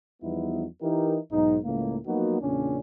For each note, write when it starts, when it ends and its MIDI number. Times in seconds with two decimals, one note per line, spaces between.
0.22 0.65 40
0.22 0.65 53
0.22 0.65 55
0.22 0.65 59
0.22 0.65 63
0.22 0.65 64
0.81 1.18 52
0.81 1.18 63
0.81 1.18 64
0.81 1.18 67
0.81 1.18 70
1.32 1.58 35
1.32 1.58 44
1.32 1.58 63
1.64 1.97 37
1.64 1.97 45
1.64 1.97 49
1.64 1.97 58
2.06 2.41 53
2.06 2.41 54
2.06 2.41 58
2.06 2.41 59
2.06 2.41 63
2.06 2.41 66
2.41 2.79 40
2.41 2.79 46
2.41 2.79 49
2.41 2.79 61
2.41 2.79 62